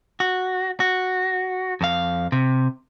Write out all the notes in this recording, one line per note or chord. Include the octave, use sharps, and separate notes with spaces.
F#4
F#4
F2 F5
C3